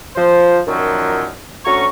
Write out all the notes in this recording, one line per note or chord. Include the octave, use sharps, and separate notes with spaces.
F3 C5
F#2 A#2 D#3 F3 F#3
D2 C#4 F#4 A#5 C#6